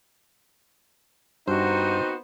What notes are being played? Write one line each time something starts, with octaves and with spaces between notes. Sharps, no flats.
G2 B3 C4 D#4 F#4 C5